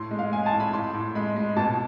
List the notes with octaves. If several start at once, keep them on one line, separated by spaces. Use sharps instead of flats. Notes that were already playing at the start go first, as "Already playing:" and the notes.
Already playing: A2 C6
G#3
F5
G#3 G#5
A5
A2
B5
A2 C6
A2
G#3 B5
G#3
B2 A5